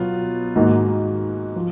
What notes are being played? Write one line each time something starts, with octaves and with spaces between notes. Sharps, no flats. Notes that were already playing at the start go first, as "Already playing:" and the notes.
Already playing: B2 F#3 B3 F4
G#2 D#3 A#3 D#4 F#4
F3